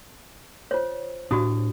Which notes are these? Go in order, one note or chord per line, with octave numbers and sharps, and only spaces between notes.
F4 C5 C#5
A2 D4 F#4 G4 D#6